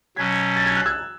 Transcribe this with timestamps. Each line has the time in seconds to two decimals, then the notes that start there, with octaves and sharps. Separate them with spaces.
0.16 B2 F#3 C#4 G#6 B6
0.56 A6
0.66 G#6
0.76 F#6
0.86 E6 G#6